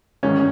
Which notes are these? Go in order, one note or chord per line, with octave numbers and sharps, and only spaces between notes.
A1 G#2 D#3 C#4